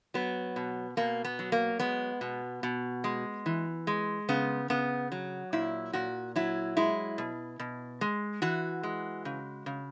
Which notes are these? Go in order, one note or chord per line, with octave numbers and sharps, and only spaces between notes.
F#3 B3
B2
B2 A#3
B3
F#3
A#3
G#3 B3
B2
B2
G#3
E3
G#3
C#3 B3
C#3 B3
F#3
A#2 E4
A#2 F#4
F#3 E4
G#3 E4
B2
B2
G#3
E3 F#4
G#3
C#3
C#3